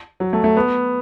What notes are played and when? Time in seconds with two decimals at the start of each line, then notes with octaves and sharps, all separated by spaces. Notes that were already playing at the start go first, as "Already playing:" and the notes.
0.20 F#3
0.33 A3
0.44 A3
0.57 B3